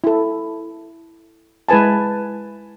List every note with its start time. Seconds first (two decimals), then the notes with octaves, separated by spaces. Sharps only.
0.04 E4 A4
1.69 G#3 E4 B4 G#5 A5